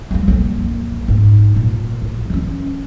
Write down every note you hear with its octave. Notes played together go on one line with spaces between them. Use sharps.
F3 G3
A#1 F2
G#2 D4
A#2
A1
E3 C#4